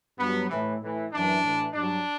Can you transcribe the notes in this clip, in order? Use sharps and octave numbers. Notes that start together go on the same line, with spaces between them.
G2 F#3 B3
A2 E3
A2 E3
F#2 E3 D4
A2 E3
G2 F#3 D4